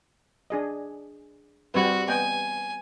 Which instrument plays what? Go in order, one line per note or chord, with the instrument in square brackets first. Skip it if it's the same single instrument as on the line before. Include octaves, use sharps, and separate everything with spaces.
[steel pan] D4 G#4 D#5
[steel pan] G3 C4 B4 [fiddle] F#4
[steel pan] B3 D#5 G5 [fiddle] G#5